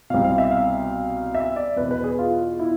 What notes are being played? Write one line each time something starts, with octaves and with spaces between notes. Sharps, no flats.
C2 B2 F5
F5
E5
F5
E5
D5
E2 B2 B4
B4
G#4
F4
E4